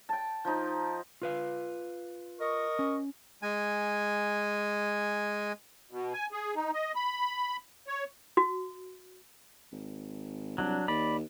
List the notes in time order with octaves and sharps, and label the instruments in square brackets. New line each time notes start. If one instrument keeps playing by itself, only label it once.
[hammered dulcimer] G5 A5
F3 D#4
[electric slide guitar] F4 B4 F5
[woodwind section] A#4 D#5 C#6
[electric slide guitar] C#4
[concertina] G#3 G#5
[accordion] B2
G#5
G#4
D#4
D#5
B5
C#5
[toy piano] F#4
[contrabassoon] G#1
[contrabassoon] C2 [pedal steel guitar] F#3 D4
[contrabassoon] D#2 [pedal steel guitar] D5 B5